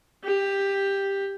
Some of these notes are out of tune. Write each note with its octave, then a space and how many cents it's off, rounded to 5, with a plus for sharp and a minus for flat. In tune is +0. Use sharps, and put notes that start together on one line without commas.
G4 +10